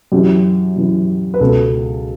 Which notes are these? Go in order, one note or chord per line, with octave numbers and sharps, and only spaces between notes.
F#2 E3 G4
F#2 E3
B4
C#2 B2 A4